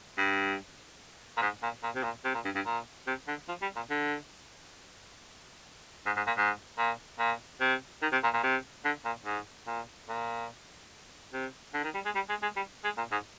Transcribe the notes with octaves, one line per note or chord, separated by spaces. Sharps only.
G2
A#2
G#2
A#2
A#2
C3
A#2
C3
A#2
G2
G2
A#2
C3
D3
F3
G3
A#2
D3
G#2
G#2
A#2
G#2
A#2
A#2
C3
D#3
C3
A#2
A#2
C3
D3
A#2
G#2
A#2
A#2
C3
D3
D#3
G3
G#3
G3
G#3
G#3
G3
G#3
A#2
G#2